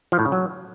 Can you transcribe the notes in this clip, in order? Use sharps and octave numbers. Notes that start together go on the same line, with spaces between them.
F3
A2
C#3
F#3